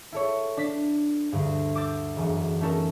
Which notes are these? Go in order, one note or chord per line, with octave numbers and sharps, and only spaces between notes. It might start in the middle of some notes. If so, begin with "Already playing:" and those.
E4 A4 C#5
D4 B6
D2 G2
D6 E6 G6 A6
E1 F#2
A3 C#4 D#4 A4 A#4